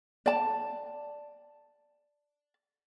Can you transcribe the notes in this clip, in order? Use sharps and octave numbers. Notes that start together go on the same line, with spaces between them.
D5 A5